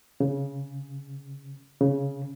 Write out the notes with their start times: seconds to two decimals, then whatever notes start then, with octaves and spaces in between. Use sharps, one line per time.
0.20 C#3
1.81 C#3